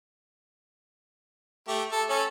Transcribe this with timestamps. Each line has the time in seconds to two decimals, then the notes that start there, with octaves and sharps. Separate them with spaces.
1.68 A3 G4
1.92 A4
2.10 C#4 A4